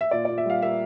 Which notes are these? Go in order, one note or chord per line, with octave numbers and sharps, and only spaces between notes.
E5
A#2 D5
A#2 D5
E5
G3 F5
A#3 E5